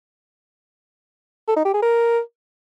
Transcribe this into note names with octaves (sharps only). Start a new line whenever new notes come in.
A4
D#4
G4
G#4
A#4